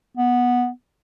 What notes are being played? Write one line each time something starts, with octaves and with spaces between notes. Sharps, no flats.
B3